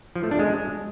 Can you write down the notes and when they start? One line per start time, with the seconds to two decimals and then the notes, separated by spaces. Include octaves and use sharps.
0.16 F3
0.23 A3
0.31 D4
0.39 G#3